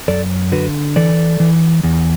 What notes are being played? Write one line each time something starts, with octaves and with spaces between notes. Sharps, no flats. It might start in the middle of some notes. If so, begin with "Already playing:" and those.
F#2 A4 D5
D3 F#4 B4
E3 A4 D5
E3
E2